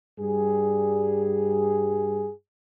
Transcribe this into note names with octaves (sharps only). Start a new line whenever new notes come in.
G2 G3 G#4